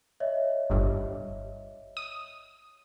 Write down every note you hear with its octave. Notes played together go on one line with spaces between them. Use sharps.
C#5 D#5 E5
G1 G2
D#6